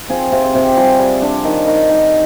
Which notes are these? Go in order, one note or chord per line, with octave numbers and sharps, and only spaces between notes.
C4 F4 G#4
C3 F4
G#4
C3 G4
G3 F4 G#4
G3
D4
D#3
D#3
D#3